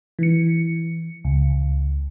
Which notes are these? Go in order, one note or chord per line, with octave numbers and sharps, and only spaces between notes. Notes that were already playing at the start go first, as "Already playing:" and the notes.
E3 C#7
C#2